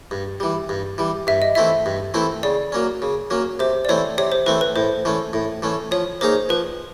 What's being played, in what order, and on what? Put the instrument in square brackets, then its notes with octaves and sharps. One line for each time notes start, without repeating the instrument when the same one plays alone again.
[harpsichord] G2
E3 G3
G2
E3 G3
[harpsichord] G2 [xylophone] E5
[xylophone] D#5
[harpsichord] E3 A3 C4 E4 [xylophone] E5
[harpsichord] G2
E3 A3 C4 E4
[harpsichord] C#3 [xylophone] D5
[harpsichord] F#3 A#3 C#4
C#3
F#3 A#3 C#4
[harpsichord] C3 [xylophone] C5
[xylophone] D5
[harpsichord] E3 A3 C4 [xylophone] C#5
[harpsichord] C3 [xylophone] C#5
[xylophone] C5
[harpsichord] E3 A3 C4 [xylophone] B4
[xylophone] B4
[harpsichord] A2 [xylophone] C5
[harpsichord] E3 A3 C#4
A2
E3 A3 C#4
[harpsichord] F3 [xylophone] C#5
[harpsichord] A#3 D#4 G#4 C#5 [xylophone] C5
[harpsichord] F3 [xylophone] B4